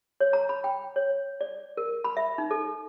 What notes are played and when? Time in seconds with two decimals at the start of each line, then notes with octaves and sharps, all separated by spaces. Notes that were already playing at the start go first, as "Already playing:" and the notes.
0.20 C#5
0.33 A#5
0.49 B5
0.64 G5
0.96 C#5
1.41 D5
1.77 A#4
2.04 B5
2.17 E5
2.38 D#4
2.51 A4